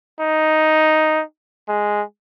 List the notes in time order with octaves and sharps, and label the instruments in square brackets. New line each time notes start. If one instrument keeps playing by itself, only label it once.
[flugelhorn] D#4
G#3